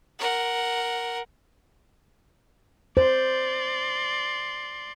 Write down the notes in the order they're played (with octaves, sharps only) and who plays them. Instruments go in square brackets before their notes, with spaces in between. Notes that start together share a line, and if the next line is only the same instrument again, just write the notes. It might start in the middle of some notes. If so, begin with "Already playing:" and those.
[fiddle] A#4 F#5
[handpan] C5 [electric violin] D5 C6